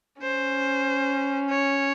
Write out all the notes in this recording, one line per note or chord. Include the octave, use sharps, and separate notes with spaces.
C#4 C5
C#5